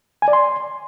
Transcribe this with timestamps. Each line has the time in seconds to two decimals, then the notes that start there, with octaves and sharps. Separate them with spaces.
0.22 G#5
0.28 D5
0.33 C6